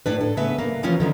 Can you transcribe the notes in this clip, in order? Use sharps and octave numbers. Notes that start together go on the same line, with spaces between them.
A2 D4 B4
A4
C#3 A3 B3 B4 E5
A#3
E3 F3 C#4 F4
D3 D#3 F#3